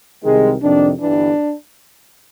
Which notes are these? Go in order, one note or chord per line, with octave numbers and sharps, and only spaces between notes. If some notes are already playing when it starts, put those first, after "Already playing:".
C2 C3 D#3 G#3
F2 C3 D#3 D4
G1 G2 E3 D4